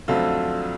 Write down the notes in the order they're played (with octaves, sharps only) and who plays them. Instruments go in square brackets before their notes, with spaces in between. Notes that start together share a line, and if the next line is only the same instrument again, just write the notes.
[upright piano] F2 D3 F#3 A3 C4 F4